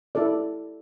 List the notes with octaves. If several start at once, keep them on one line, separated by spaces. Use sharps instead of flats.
E4 A4 D5